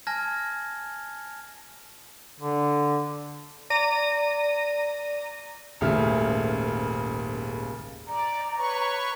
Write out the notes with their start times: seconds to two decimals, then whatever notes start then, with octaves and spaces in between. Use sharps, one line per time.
0.07 G#5 A5 F6 G#6 A#6
2.40 D3
3.70 D5 A#5 A#6 D#7
5.81 D#1 G#1 C#3 A3 E5 F6
8.08 D5 A#5
8.57 B4 C#5 C#6